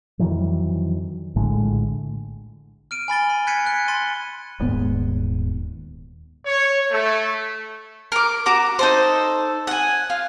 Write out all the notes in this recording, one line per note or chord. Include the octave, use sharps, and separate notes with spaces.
F2 D#3 E3 F#3
A#1 A2 D3 G#3
F6 D7 D#7
G#5 B5 A6 G7
B5
F#6 G#6 B6 C#7 D#7
F#6 C#7
C6 A6 D#7 G7
D#1 D#2 G#2 B3
C#5
A3
A#4 D6
F#4 A#5 D6
D#4 A4 C5
F#5 G#5
F4